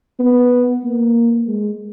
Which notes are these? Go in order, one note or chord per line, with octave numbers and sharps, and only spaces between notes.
B3
A#3
G#3